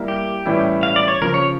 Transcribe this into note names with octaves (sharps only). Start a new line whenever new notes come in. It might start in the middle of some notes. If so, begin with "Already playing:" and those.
Already playing: G3 A#3 E4
G4
A2 E3 G3 C#4 E4
F5
D5
C#5
C#3 F3 C#4 A#4
C#5